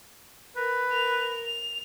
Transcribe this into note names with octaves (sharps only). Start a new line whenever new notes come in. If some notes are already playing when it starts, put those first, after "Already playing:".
A#4 B4
A#4 F7
F7